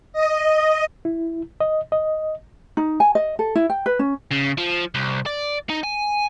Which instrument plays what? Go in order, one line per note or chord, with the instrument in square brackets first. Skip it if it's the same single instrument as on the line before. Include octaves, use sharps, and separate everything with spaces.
[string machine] D#5
[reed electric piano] E4
D#5
D#5
[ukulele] D#4
G#5
D#5
A4
E4
G5
B4
C#4
[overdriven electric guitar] C#3
F3
C2
D5
D#4
G#5